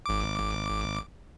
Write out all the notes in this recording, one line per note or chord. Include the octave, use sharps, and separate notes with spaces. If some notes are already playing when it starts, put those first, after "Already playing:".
G#1 D6